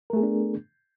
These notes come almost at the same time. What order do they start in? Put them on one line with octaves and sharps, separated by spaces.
A#4 A3 G#4 B3 D4